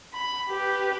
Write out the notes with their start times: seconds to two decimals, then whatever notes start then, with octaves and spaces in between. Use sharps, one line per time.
0.13 B5
0.49 G4 B4